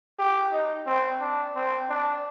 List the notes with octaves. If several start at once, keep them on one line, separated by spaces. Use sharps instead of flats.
G4
D#4
C4
D4
C4
D4